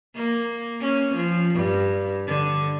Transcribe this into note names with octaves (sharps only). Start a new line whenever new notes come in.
A#3
C#4
F3
G2
D3